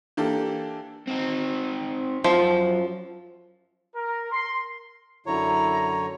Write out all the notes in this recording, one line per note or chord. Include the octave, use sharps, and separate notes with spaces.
E3 A#3 D4 G4 A4
C4 D#4
F#2 F3
A#4
C6
F#2 D3 E4 C#5 A#5